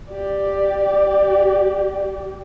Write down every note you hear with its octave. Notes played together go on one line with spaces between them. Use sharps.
G4 D5